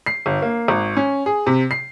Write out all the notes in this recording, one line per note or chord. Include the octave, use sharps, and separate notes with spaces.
C7
G1
A#3
G#1
C#4
G#4
C3
C7